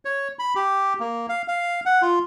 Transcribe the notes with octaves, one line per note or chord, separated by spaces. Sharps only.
C#5
B5
G4
A#3
F5
F5
F#5
F4